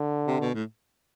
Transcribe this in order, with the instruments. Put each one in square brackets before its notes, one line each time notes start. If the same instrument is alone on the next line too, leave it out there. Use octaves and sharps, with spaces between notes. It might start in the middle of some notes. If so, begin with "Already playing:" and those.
Already playing: [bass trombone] D3
[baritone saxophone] C3
B2
A2